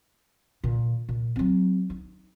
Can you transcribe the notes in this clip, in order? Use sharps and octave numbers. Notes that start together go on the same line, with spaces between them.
A#2 D3
A#2
F#3 C4
D#4